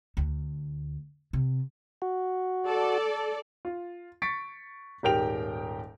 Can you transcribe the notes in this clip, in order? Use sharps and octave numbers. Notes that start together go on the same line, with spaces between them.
D2
C3
F#4
A4 D5
F4
C#6 A6 B6 C#7 D7
D#1 G#2 G4 A#4 G5 F7